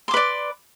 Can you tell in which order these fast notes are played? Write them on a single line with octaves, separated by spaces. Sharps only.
C6 D6 B4 D5